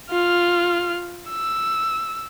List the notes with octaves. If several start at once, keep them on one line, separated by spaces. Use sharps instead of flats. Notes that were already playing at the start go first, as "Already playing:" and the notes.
F4 F6
E6